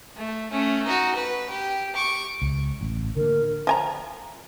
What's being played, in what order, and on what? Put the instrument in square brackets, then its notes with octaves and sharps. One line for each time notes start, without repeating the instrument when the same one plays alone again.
[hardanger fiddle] A3
A3 C#4
D#4 F#4
B4
G4
C#6 D6
[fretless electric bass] C#2
A1
[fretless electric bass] D3 A#3 [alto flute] A#4
[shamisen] F3 G#5 A#5